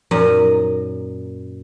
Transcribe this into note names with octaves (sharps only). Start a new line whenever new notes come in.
F#2 A#2 D#4 D#5